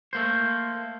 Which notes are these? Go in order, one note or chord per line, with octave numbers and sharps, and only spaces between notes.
A3 A#3 C5